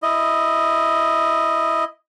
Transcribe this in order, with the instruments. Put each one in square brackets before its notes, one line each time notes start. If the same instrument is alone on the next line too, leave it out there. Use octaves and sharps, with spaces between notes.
[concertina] E4 D#5